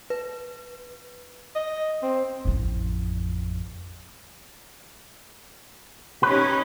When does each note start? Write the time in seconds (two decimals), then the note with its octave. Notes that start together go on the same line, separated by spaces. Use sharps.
0.10 B4
1.55 D#5
2.03 C4
2.45 A1 F2
6.23 C#4 D#4 G4 B4